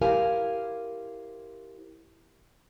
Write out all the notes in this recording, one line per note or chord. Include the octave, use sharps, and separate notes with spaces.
E4 G4 A#4 C5 F5 G#5